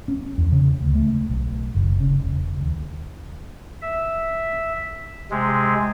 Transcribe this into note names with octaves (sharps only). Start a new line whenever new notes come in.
C#4
E2
C#3
D2
A3
B1
F#1
C#3
E1
D#2
E5
C3 G#3